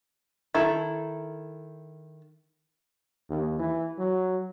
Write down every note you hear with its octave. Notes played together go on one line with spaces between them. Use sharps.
D#3 E4 A4
D#2
E3
F#3